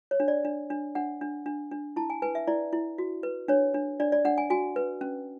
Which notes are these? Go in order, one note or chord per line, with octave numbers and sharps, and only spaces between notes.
C#5
D4
D5
D4
D4
D4 F#5
D4
D4
D4
E4 A5
G#5
B4 G#5
E5
E4 D5
E4
F#4
B4
D4 C#5
D4
D4 D5
D5
D4 F#5
G#5
F#4 G#5
B4
C#4